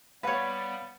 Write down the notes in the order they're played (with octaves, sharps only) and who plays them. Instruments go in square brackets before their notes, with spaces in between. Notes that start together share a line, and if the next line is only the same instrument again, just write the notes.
[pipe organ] G3 B3 [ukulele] B4 C#5 [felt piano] F5 F#5